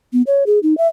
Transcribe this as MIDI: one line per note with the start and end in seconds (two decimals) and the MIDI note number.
0.13 0.22 59
0.27 0.44 73
0.46 0.59 68
0.63 0.76 63
0.78 0.87 76